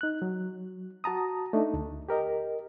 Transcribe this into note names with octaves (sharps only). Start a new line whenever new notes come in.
D#4 F#6
F#3
F#4 A5 A#5 D#6
A3 D4 D#4
D2
G4 A#4 D#5